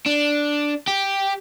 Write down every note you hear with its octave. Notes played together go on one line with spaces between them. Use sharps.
D4
G4